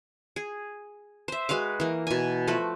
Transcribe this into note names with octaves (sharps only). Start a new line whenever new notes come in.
G#4
C5 E5
G#3 F#4 B4 F5
E3 A#3
B2 G#5
F3 A3 F#4 B4